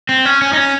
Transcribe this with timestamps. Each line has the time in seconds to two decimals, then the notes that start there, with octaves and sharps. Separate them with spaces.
0.09 C4
0.25 C#4
0.42 C#4
0.53 D#4
0.57 C#4